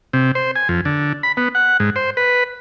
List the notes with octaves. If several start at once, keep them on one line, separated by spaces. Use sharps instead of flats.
C3
C5
G#5
F2
D3
B5
B3
F#5
G#2
C5
B4